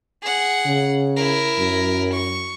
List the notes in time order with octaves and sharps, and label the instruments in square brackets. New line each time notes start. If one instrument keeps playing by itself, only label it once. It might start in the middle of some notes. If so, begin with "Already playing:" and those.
[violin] G#4 F#5
[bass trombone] C#3
[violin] E4 A#4
[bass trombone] F#2
[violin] C#6